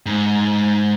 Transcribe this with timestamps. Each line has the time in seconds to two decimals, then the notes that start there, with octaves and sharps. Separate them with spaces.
0.06 G#2